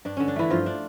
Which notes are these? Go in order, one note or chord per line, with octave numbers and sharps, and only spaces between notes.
G2 D4
D3 C#4
D4
E3 A3 E4
G2 F3 F4
D4